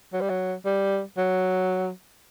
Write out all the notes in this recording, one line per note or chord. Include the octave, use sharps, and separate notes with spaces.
F#3
G3
F#3
G3
F#3